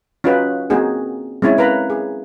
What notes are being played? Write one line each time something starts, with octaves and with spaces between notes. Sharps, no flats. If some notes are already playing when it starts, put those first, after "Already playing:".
C#4 D#4 F4 F#4 B4
A#3 C4 D#4 F#4 G#4
G#3 C4 C#4 E4 C#5
A#4 B4 F5 A#5 B5
G#4